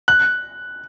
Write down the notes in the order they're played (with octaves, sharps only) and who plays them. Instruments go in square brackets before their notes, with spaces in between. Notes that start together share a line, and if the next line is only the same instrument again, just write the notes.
[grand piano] F#6